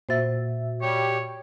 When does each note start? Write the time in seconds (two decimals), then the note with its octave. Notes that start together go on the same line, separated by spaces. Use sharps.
0.09 A#2 F#4 C5 E5 A6
0.82 G3 G4 C#5